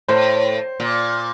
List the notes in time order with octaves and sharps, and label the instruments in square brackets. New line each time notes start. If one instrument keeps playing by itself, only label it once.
[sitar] A2 [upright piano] C5
[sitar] A#2